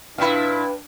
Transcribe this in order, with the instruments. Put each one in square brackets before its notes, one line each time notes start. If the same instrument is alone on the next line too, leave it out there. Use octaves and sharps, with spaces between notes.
[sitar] A#2 E4 [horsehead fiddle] D4 [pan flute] B4 [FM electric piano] F5 G5 B5